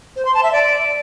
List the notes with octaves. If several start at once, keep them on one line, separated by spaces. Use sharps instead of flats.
C5
C6
A5
E5
D5